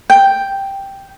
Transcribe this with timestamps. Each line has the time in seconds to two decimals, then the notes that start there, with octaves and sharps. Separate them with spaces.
0.10 G5